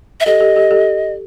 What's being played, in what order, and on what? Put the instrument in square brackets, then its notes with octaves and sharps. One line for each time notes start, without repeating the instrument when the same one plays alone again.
[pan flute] E5
[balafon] G4 A4 [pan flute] D#5
[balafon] G4 A4
G4 A4
G4 A4